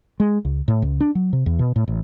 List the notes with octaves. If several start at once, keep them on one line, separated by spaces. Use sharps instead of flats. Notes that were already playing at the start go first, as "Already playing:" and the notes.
G#3
C#2
A2
C#2
D4
F#3
C3
E2
B2
A2
A1